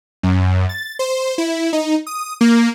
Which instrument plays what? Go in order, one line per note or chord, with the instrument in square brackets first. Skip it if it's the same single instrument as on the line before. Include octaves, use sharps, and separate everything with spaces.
[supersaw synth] F#2
A6
C5
E4
D#4
D#6
A#3